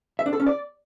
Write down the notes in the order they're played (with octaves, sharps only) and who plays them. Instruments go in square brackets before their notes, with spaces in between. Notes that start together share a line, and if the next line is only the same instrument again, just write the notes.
[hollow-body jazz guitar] E5
D4
A4
C#4
D5